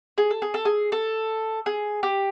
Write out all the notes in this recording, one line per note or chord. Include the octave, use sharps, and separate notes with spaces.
G#4
A4
G#4
A4
G#4
A4
G#4
G4